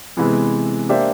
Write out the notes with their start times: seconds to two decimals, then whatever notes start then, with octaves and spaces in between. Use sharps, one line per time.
0.17 C3 E3 G#3 B3
0.89 A#3 D4 G4 C5 E5